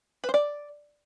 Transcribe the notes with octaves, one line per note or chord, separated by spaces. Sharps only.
B4
C5
D5